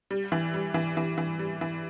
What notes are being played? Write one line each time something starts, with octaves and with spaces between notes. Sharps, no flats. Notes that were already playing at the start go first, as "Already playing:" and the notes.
G3
E3
G3
E3
E3
E3
G3
E3